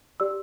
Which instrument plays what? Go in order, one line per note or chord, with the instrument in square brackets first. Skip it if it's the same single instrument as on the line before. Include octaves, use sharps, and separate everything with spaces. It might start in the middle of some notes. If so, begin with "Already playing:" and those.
[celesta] G4 D5 E6